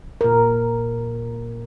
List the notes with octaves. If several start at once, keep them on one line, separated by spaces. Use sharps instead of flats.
A#2 A#4